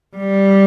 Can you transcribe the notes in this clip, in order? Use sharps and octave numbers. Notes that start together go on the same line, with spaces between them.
G3